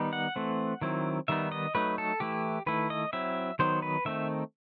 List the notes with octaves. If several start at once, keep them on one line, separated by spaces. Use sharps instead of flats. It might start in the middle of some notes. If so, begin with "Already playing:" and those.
Already playing: D#3 G3 B3 D#4
F#5
E3 A3 C4
D#3 F#3 C4 E4
D#3 G3 B3 D#4 E5
D#5
F#3 A3 D#4 B4
A4
E3 A3 E4 G4
D#3 A3 E4 B4
D#5
F#3 C4 E4 E5
D#3 F#3 B3 D#4 C5
B4
D#3 A3 C4 D#4 E5